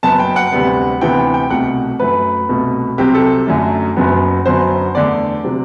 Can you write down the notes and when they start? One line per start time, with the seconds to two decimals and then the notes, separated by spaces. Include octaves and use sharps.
0.03 F#1 F#2 F#3 B3 A5
0.19 G5
0.36 F#5
0.52 D2 C3 G3 B3
1.01 D2 C3 E3 B3 G5
1.34 G5
1.50 C2 B2 A3 F#5
1.99 F#2 F#3 A3 B4
2.49 C2 B2 A3
2.98 C2 C3 F#3 G4
3.15 A4
3.47 F#2 D3 F#3 A3
3.96 F#1 F#2 F#3 B3
4.46 F#2 D3 F#3 B3 C5
4.95 E2 D3 A3 D5
5.44 C3 F#3